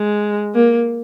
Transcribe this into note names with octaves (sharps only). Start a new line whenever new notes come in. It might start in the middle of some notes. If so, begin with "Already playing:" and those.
Already playing: G#3
A#3